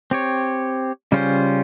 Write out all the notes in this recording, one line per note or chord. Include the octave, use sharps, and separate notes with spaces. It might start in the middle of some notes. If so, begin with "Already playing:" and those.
C4 G4 C#5
C#3 G3 C#4 F4 C5